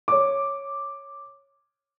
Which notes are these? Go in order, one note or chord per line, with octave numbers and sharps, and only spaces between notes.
C#5 D6